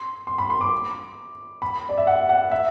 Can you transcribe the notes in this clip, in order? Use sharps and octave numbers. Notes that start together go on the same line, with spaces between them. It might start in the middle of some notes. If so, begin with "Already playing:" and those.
Already playing: C6
C6
B5
C6
D6
B5
D5
E5
F#5
F#5
E5